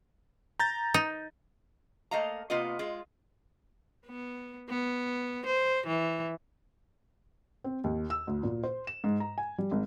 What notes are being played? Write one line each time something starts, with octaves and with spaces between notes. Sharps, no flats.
A#5 G6 A6
D#4
A3 A#3 D#5 F5 A#5
C3 A#3 B3 F4 D#5
G#3 F4
B3
B3
C5
E3
C4
D#2
E6
D2
A#2
C5
E7
G#2
A#5
G#5
G3
G#1